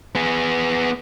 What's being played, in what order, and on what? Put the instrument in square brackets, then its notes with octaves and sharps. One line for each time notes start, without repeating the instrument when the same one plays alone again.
[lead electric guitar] B3 G#4